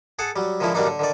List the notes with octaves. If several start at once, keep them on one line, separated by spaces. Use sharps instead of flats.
G#4 A4 F#5 A5
F#3 G3
D3 D#3 F3 G#3 E4
D#3 F#3 G3 A#3 D4 D#4
D3
D3 D#3 D5